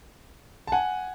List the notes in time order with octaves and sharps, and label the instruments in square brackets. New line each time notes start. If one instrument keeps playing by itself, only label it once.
[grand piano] A5
F#5 G#5